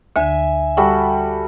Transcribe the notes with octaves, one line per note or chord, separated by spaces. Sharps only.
D2 D3 E5 G#5
G3 F#4 A4